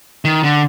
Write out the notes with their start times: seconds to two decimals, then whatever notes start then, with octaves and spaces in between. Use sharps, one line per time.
0.25 D#3
0.43 D3